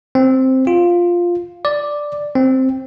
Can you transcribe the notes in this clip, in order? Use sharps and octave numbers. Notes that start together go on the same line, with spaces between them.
C4
F4
D5
C4